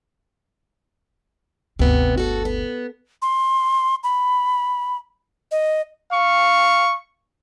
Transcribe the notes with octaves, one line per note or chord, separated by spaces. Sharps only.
G1 D2 C3 B3
F#4 A4
B3
C6
B5
D#5
F5 C#6